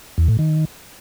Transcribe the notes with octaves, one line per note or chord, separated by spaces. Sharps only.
E2
A2
D#3